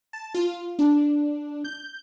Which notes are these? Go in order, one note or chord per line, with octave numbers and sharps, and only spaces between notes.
A5
F4
D4
G6